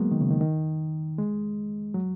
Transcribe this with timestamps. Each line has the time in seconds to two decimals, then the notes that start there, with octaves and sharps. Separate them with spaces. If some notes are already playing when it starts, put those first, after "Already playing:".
Already playing: F#3 G#3 A#3 B3
0.11 D#3
0.21 C#3
0.31 D#3
0.41 D#3
1.18 G#3
1.94 F#3